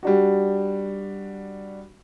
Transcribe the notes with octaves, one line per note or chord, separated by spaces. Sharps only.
G3 D4 F#4